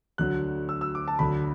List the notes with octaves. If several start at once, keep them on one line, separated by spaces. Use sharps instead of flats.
D2 D3 F#3 F#6
E6
E6
D6
A5
D2 D3 F#3 B5